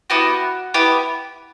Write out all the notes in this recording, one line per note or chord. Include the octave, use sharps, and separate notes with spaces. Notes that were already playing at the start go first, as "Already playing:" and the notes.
B3 E4 F#4 G4 F#5
B3 E4 G4